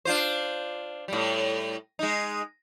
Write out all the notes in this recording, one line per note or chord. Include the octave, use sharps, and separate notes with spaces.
D4 F4 C5
A2 G3
G#3 D#4